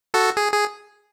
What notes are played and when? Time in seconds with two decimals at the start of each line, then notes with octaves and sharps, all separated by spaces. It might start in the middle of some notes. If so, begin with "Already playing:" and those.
0.14 F#4 A4
0.37 G#4
0.53 G#4